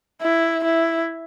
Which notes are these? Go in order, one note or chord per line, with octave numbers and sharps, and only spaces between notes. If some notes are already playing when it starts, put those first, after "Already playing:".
E4
E4